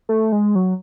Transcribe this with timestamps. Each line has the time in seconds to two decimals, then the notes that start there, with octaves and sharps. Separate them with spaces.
0.09 A3
0.32 G#3
0.55 F#3